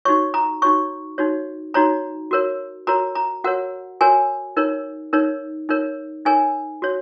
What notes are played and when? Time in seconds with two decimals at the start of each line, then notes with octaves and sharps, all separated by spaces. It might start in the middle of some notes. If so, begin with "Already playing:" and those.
0.05 D#4 F#4 C#5 C#6
0.34 A#5
0.62 D#4 F#4 C#5 C#6
1.18 D#4 F#4 C#5
1.74 D#4 F#4 C#5 A#5
2.31 F#4 A#4 C#5
2.87 F#4 A#4 C#5 A#5
3.15 A#5
3.44 F#4 A#4 C#5 F#5
4.01 F#4 A#4 C#5 G#5
4.57 D#4 A#4 C#5
5.13 D#4 A#4 C#5
5.69 D#4 A#4 C#5
6.25 D#4 A#4 C#5 G#5
6.82 F#4 C#5